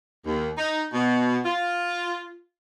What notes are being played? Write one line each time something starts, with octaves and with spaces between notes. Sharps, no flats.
D#2
D#4
B2
F4